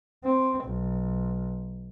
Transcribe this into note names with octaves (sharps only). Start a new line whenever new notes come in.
C4
B1